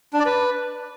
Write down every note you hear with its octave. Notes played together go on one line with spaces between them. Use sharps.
D4
D5
B4